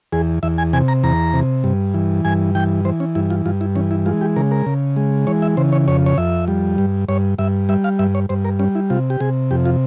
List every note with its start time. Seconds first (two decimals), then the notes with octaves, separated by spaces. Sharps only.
0.12 E2 G#4
0.43 E2 E5
0.58 G#5
0.73 C3 G#5
0.88 A#5
1.03 E2 A#5
1.34 C3
1.64 G2
1.94 E3
2.25 G2 G#5
2.55 E3 G5
2.85 E3 C5
3.00 C#4
3.15 G2 E4
3.30 F4
3.46 G2 F4
3.61 E4
3.75 E3 C#4
3.91 E4
4.06 G#3 F4
4.21 G4
4.36 C#3 A#4
4.51 A#4
4.66 C#3
4.96 G#3
5.27 E3 C#5
5.42 E5
5.57 C#3 C5
5.72 C#5
5.88 F2 C#5
6.06 C#5
6.18 F2 E5
6.48 G3
6.78 G2
7.09 G2 C#5
7.38 G2 E5
7.69 G3 E5
7.84 F5
7.99 G2 E5
8.15 C#5
8.29 G2 C5
8.45 A#4
8.59 G3 C#4
8.75 E4
8.90 C3 F4
9.10 G4
9.20 C3 G#4
9.51 F2 G4
9.65 F4